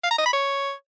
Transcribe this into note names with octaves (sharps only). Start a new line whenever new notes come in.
F5
A#5
D#5
B5
C#5